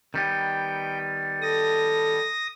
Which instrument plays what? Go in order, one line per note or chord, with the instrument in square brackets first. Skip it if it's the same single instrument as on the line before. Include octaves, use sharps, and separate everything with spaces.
[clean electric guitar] D#3 G3 B3 [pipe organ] G5
[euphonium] A4 [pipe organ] D#6 A#6